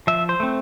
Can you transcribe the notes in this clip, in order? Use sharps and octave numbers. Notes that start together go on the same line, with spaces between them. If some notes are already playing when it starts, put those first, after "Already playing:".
F3 E5
C5
A3 C4